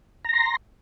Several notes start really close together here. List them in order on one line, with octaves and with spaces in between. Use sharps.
A#5 A#6 C6